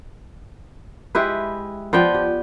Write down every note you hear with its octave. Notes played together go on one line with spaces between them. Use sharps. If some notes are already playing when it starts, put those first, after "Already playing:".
G#3 E4 G4 B4
F3 B3 D5 G5
G4